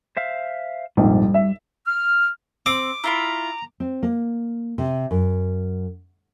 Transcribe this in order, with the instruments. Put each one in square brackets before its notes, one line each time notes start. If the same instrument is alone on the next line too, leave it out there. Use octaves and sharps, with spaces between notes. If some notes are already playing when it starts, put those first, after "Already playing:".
[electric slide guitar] C5 E5 F5
[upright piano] A#1 F2 G#2 [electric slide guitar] G3
[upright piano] E5
[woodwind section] F6
[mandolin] C4 [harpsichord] D6
[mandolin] E4 F4 B5 [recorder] A#5
[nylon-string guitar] C4
A#3
C3
F#2